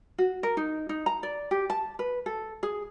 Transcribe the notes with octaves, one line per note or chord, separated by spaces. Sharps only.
F#4
A#4
D#4
D#4
A#5
D5
G4
A5
B4
A4
G#4